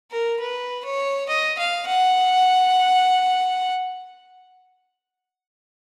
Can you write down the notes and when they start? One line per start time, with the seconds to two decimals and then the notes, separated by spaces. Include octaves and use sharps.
0.11 A#4
0.40 B4
0.85 C#5
1.29 D#5
1.58 F5
1.87 F#5